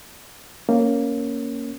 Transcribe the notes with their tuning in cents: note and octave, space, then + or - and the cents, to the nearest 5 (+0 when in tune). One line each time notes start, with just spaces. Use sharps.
A#3 +0 C#4 +0